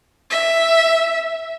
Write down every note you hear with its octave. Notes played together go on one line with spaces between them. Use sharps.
E5